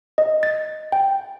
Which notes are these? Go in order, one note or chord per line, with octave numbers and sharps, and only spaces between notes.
D#5
A6
G5